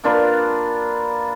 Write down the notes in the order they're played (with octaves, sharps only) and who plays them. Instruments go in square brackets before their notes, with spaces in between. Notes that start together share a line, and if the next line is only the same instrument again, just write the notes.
[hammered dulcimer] A#3 D4 F4 B4